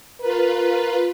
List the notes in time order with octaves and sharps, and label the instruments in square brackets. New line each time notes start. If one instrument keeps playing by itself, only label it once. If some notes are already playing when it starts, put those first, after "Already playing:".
[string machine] F4 B4 [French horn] A#4